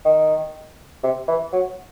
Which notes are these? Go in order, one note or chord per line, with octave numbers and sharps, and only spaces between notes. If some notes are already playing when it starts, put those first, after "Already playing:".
D#3
C3
E3
F#3